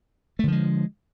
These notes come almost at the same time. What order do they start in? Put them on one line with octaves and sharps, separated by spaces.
A3 D3 F3 G#3